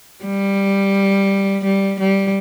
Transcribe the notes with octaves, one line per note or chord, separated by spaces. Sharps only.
G3
G3
G3